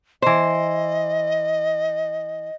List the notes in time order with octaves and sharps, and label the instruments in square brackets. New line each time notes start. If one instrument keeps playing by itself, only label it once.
[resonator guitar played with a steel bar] E3 C5 [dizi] D#5